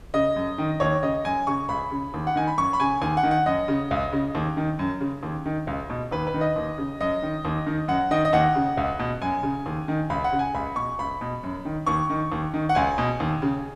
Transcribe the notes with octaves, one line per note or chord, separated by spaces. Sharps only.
C#3 D#5
F#2
D#3
D#2 C#5
C#3 D#5
F#2 G#5
C#3 C#6
C#2 B5
C#3
D#2
F#5
D#3 G#5
B5
F#2 C#6
B5
C#3 G#5
D#2 G#5
F#5
D#3
F#5
F#2 D#5
C#3
C#2
C#3
D#2
D#3
F#2
C#3
D#2
D#3
C#2
B2
D#2 B4
B4
D#3
D#5
D#2
C#3
F#2 D#5
D#3
D#2
D#3
F#2 F#5
D#3 D#5
D#5
D#2 F#5
C#3
C#2
B2
F#2 G#5
C#3
D#2
D#3
C#2 B5
F#5
C#3
G#5
C#2 B5
B2 C#6
C#2 B5
B2
F#2
D#3
D#2 C#6
D#3
D#2
D#3
F#5
C#2 G#5
B2
D#2
C#3